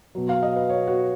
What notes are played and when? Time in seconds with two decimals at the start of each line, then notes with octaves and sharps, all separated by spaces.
0.15 B2 F#3
0.29 F5
0.43 D#5
0.56 B4
0.69 C#5
0.87 F#4